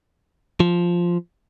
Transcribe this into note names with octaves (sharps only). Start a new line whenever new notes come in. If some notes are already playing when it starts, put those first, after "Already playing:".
F3